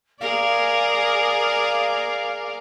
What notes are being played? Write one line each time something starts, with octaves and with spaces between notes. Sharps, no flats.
G#4 A#4 D5 F5